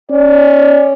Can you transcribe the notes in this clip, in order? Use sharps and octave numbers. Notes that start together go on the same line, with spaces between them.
C#4 D5